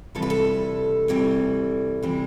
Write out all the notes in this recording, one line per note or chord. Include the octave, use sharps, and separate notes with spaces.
D2 C3 E3 G3 A4
B4
A4
D2 C3 E3 G3
C3 E3 G3